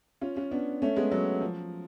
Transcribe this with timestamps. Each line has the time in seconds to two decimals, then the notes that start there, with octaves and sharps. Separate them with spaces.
0.21 C#4 F4
0.36 C#4 F4
0.51 B3 D4
0.82 A3 C#4
0.96 G#3 B3
1.12 F#3
1.41 F3